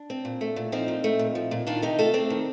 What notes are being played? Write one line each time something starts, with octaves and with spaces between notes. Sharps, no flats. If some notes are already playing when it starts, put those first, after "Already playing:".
Already playing: D4
C4
A#2
A3
A#2
F3 C4 D#4
A#2
A3
A#2
F3
A#2
D#3 D4 F4
C3 D#4 G4
A3 F4 A4
C4 D4
D#3